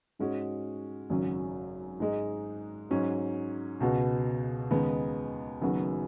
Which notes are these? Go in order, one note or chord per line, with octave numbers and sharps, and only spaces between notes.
G#2 G#3 C#4 F#4
G#1 F#2 C#3 F#3 C#4
G#2 G#3 D#4
G#2 F#3 C#4
C#2 B2 B3 F#4
D#2 C#3 G#3 B3 D#4
F#1 F#2 D#3 B3 F#4